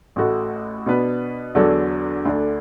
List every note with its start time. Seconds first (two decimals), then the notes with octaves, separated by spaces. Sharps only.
0.16 A1 A2 A3 F#4 A4
0.86 B2 B3 D4 B4
1.55 E2 D3 F#3 D4 A4
2.25 D2 D3 A3 D4